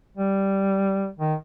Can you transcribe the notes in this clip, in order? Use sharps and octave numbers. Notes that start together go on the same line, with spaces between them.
G3
D#3